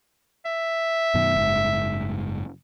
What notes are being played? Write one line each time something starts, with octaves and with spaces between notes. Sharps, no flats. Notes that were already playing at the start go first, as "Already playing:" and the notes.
E5
F#2 B2 D#3
F#1 G#2